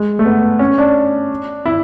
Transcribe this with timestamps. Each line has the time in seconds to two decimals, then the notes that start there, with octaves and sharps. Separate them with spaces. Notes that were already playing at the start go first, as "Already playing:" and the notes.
Already playing: G#3
0.19 A3
0.25 B3
0.59 C#4
0.78 D4
1.65 E4